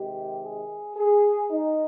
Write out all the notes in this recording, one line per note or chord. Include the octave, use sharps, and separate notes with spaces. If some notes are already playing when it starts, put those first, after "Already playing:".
Already playing: C3 D#3 G#3 G4
G#4
G#4
D#4